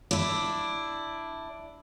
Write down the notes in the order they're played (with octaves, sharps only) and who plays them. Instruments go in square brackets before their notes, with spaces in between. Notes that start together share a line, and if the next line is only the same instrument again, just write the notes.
[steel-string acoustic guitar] D4 E4